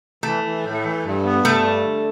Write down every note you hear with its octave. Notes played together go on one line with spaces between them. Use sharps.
E3 A3
E3
A2
E3
G2
B3
G2 A3
G3
D3